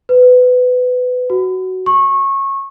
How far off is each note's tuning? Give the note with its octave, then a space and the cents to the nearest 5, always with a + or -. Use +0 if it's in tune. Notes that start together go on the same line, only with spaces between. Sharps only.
B4 +20
F#4 +10
C#6 -20